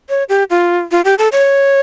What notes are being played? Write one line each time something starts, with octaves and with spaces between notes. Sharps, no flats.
C#5
G4
F4
F4
G4
A4
C#5